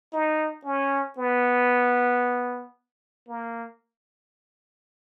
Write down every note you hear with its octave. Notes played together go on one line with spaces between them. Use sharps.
D#4
C#4
B3
A#3